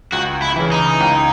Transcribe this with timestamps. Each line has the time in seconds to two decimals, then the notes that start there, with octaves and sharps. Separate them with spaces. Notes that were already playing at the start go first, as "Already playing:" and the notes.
0.12 C#2 F#4
0.42 E4
0.56 C#3 E3
0.72 D#4
1.00 C#2